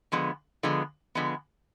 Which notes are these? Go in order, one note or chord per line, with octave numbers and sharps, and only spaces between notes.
D3 F3 G#3 B3
D3 F3 G#3 B3
D3 F3 G#3 B3